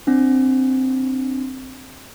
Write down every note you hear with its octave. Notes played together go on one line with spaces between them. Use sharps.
C4 D4